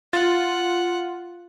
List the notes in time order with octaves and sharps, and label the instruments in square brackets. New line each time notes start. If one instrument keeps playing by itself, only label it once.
[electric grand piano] F4 A6 [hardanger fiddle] F#5